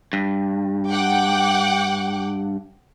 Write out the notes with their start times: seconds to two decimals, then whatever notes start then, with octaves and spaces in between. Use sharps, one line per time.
0.13 G2
0.88 F#5 G5 D6